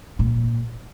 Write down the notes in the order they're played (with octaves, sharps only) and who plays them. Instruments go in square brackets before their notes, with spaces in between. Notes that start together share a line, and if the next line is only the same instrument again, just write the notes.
[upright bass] A#2